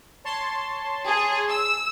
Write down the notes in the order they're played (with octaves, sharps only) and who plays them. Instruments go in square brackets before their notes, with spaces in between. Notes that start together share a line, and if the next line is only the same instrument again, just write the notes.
[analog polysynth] C#5 A5 C6
[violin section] G#4
E6